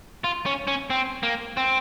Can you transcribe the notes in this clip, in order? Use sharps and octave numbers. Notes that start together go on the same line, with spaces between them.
F4
C#4
C#4
C4
A#3
C4